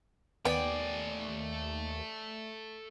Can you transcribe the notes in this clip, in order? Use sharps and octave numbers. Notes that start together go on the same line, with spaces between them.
D#2 A3 B3 D5 G5 G#5